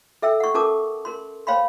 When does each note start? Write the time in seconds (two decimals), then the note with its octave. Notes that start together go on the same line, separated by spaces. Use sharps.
0.22 A4 E5 G5 E6
0.40 F#5 C#6
0.54 C#4 A4 A#4 A5 D6 D#6
1.05 A#4 C6
1.47 C5 C#5 F5 G5 B5 C6